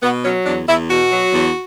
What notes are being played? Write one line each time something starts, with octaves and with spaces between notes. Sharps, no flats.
B2 B3
F#3 C#4
E2 D4
E2 E4
B2 F#4
F#3
E2